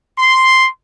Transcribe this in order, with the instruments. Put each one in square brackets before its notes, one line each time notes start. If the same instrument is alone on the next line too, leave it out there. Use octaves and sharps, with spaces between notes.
[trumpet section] C6